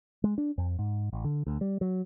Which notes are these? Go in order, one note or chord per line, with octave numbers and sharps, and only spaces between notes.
G#3
D4
F2
G#2
A1
D3
D2
G3
F#3